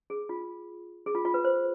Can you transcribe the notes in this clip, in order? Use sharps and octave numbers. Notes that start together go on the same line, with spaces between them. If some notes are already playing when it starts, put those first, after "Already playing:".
G#4
F4
G#4
F4
F4
B4
C5